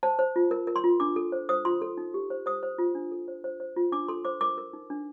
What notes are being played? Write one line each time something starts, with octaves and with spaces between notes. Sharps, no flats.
C5 A5
C5
F4
A#4
A#4
C6
F4
D4 D6
A4
C5
C5 D#6
F4 C6
A4
D#4
G4
C5
C5 D#6
C5
F4
D4
A4
C5
C5
C5
F4
D4 D6
A4 C6
C5 D6
A#4 D6
A#4
D#4
D4